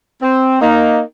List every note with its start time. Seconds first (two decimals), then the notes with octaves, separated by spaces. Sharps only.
0.22 C4
0.61 A#3 D#4